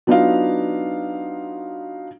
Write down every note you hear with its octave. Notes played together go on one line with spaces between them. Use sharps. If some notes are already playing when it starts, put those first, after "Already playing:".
F#3 B3 D4 D#4 F4 F5